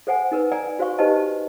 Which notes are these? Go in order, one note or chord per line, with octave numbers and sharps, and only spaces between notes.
A4 C5 F#5 G#5
D#4 A#4 B4
D5 G5 G#5 A#5
F#4 C5 F5 C#6
D#4 G4 B4 C5 D#5 A5